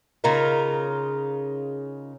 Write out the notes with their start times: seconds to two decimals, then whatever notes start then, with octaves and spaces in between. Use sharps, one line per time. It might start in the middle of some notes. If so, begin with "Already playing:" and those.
0.24 C#3 D#4 F4 A#4